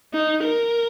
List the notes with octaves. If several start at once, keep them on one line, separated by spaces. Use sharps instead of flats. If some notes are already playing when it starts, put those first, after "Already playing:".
D#4
A#4